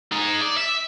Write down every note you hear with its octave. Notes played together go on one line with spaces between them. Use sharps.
D#4 G#4
D5
E5